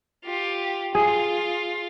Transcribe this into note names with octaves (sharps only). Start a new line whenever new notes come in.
F4 G4
F4 G#4